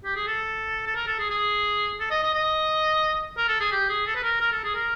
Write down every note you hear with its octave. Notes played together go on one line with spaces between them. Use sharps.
G4
G#4
A4
A4
A#4
A4
G#4
G#4
A4
D#5
D#5
D#5
A#4
A4
G#4
G4
G#4
A4
B4
A#4
A#4
A4
G#4
A#4